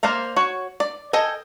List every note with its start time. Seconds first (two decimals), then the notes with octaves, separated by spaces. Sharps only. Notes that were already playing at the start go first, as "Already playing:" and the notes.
0.03 A#3 C5 D5 F5 A#5
0.36 F#4 C#5
0.80 D5
1.13 A4 D#5 G5 G#5